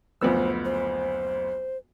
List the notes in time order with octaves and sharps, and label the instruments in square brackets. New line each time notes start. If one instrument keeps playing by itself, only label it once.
[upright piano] F#1 D2 [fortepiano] F3 B3 E6 [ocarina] C5
[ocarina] C5